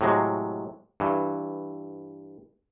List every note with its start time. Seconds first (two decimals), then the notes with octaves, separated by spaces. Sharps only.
0.01 A2 C3 F#3 G#3
1.00 G2 E3